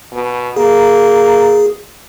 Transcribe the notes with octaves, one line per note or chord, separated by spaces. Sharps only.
B2
A#3 G#4